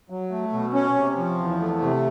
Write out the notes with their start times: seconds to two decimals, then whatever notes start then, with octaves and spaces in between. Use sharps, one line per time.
0.10 F#3
0.31 A3
0.52 B2
0.74 C#4
0.96 C3
1.17 F3
1.38 E2
1.60 A3
1.81 C3